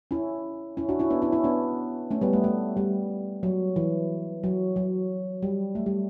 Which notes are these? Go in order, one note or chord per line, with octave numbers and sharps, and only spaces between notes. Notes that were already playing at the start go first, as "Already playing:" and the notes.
C#4 E4
C#4 E4
D4 F#4
C#4 E4
B3 D4
C#4 E4
C#4 E4
B3 D4
A3 C#4
G3 B3
A3
A3
G3
F#3
E3
F#3
F#3
G3
A3
G3